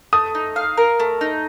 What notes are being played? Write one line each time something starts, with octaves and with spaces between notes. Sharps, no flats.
A3 D#6
D#4
F5
A#4
A3
D#4